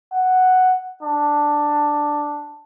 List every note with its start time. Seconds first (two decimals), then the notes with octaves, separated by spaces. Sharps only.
0.14 F#5
1.03 D4